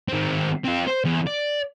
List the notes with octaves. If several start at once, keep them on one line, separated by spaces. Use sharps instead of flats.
D#3 C4
C4 F4
C5
E2
D5